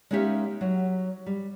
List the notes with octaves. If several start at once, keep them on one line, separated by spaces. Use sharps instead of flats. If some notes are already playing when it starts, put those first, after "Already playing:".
G#3 A#3 C#4 D#4 G4 E5
F#3
G3